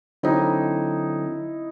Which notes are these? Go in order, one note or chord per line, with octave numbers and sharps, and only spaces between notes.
D3 F#3 C4 D#4 E4